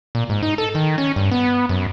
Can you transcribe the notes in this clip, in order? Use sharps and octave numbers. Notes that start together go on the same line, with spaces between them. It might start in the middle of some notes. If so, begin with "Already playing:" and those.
A#2
G#2
D#4
A4
D#3
C#4
G2
B3
F#2